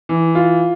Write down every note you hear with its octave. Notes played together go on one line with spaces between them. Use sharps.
E3
F4